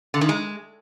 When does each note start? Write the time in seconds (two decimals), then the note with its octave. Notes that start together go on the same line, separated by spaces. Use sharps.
0.14 D3
0.21 D#3
0.29 G#3